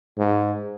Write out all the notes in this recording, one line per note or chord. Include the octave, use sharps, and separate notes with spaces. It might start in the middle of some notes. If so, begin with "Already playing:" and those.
G#2